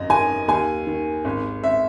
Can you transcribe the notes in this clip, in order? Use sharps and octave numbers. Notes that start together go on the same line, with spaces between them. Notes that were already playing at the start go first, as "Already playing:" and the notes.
Already playing: G#1 F#2 D#5
D#3 G#5
D#2 G#5
D#3
G#1
G#1 E5